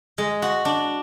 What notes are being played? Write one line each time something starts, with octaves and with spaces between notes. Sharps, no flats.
G#3
F#4
D4